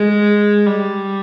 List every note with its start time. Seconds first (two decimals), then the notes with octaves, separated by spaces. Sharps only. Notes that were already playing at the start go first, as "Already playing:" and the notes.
Already playing: G#3
0.66 G3